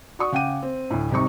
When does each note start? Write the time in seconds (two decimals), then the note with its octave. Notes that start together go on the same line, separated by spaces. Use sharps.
0.19 F#4 D5 C#6 D#6
0.32 C#3 F#5 G5 D6 D#7
0.63 C4
0.90 D2 A2
1.11 G#1 C3 G3 D#4 C#6